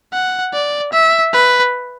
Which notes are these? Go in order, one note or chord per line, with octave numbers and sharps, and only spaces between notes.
F#5
D5
E5
B4